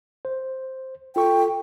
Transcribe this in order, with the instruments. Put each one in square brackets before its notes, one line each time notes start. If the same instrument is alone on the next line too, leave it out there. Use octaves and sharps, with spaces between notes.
[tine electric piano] C5
[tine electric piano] F4 A4 C#6 [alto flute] G5